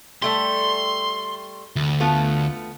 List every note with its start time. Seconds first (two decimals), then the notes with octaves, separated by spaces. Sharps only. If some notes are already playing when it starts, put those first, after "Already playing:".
0.22 G3 A3 G4 C6
1.76 D2
2.00 A3 B3 F4